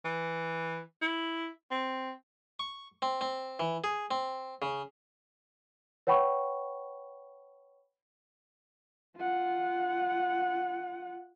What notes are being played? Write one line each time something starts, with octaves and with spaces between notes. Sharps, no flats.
E3
E4
C4
C#6
C4
C4
E3
G#4
C4
C#3
B4 C#5 F#5 G5 B5 C#6
F4 F#5